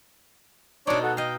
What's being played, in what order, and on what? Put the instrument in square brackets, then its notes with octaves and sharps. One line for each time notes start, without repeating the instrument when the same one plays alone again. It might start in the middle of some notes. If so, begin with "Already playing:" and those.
[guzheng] B2 D#4 [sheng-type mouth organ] D4 C#5 D5
[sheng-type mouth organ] F#4 A4
[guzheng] D#5 F5 [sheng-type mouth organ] G5